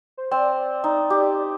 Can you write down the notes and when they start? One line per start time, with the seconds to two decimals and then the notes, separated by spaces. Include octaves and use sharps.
0.17 C5
0.31 C4 D5
0.84 D#4
1.10 G4